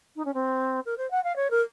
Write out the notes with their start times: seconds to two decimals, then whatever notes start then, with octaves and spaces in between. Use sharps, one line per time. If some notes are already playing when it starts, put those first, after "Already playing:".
0.16 D#4
0.25 C#4
0.34 C4
0.86 A#4
0.98 C5
1.11 F#5
1.24 F5
1.36 C#5
1.51 A#4